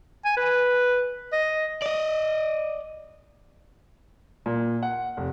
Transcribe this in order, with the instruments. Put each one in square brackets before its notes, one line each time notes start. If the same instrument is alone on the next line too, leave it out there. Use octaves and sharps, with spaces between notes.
[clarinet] G#5
B4
D#5
[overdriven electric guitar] D5 D#5
[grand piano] A#2
F#5
F1